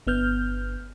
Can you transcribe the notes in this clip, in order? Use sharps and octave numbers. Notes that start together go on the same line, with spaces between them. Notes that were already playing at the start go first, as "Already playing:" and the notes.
G1 B3 F6 G6